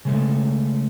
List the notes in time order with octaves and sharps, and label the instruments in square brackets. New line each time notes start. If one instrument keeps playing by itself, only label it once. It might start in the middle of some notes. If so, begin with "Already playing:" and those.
[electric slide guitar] C#3 G#3 A3